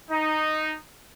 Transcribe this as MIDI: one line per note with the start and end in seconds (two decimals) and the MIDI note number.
0.10 0.74 63